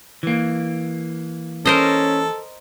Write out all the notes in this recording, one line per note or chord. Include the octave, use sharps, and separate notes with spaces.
E3 A#3
C#4 A4 A#4 C5 D#5